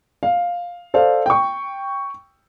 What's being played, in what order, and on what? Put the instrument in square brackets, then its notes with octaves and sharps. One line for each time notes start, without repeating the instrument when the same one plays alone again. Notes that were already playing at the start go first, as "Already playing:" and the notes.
[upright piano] F5
A4 C5 D5 F5
G5 C#6